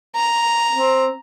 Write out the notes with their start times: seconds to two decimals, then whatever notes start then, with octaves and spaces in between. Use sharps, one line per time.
0.16 A#5
0.73 C4